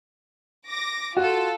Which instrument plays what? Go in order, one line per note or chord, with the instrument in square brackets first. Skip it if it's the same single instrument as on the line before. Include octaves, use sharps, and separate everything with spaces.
[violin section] D6 A#6
[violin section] F4 A4 [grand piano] F#4